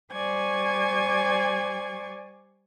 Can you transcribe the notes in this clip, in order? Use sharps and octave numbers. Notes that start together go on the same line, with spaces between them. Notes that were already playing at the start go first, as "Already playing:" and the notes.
G3 C5 D5 G#5 C#6 G#6